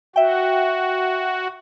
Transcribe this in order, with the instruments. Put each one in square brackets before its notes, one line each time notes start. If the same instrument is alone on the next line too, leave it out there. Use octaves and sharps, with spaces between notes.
[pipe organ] F#4 [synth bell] E5 G5